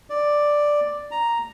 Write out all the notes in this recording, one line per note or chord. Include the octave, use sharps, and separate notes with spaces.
D5
A#5